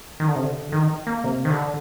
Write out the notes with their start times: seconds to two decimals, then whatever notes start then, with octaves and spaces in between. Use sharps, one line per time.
0.20 D#3
0.28 D3
0.36 C3
0.43 D3
0.72 D#3
1.07 A#3
1.24 C3
1.45 D#3
1.50 D3